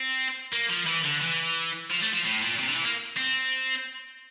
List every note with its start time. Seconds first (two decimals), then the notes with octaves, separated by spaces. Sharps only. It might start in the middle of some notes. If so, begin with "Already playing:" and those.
Already playing: C4
0.53 A#3
0.70 F3
0.87 E3
1.04 D3
1.22 E3
1.90 F3
2.02 A3
2.13 F3
2.25 A2
2.41 A#2
2.59 C3
2.68 D3
2.76 E3
2.85 A#3
3.17 C4